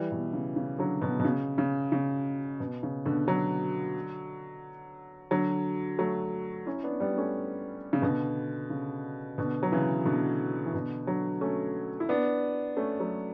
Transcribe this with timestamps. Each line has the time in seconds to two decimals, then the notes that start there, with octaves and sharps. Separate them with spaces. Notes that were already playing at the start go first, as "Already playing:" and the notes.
Already playing: E3 G3
0.11 B2
0.33 C#3
0.56 C#3
0.78 D3 F#3
1.01 B2 D3
1.20 B2
1.25 C#3
1.58 C#3
1.92 C#3
2.60 B2
2.83 C#3
3.05 B2 D3
3.27 D3 F#3
5.31 D3 F#3
5.98 F#3 A3
6.66 C#4 E4
6.83 B3 D4
7.00 G3 B3
7.18 A3 C#4
7.93 C#3
8.02 B2 D3
8.70 C#3
9.38 B2 D3
9.63 F#3
9.72 C#3 E3
10.05 B2 D3
10.66 E3
10.74 B2 D3
11.07 D3 F#3
11.41 A3 C#4
12.00 E4
12.09 B3 D4
12.77 A3 C#4
13.00 F#3 A3